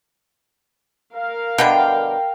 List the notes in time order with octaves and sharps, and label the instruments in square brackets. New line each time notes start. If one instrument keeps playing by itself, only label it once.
[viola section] A#4 F5
[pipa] B2 D3 G3 [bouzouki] G5